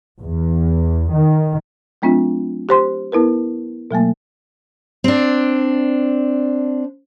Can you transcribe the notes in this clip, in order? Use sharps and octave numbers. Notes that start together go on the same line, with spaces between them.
E2
D#3
F#3 A3 C4 D4 F4
G4 C5 C6
B3 E4 A#4 B4
B2 F#3 A3 A#3
C4 D4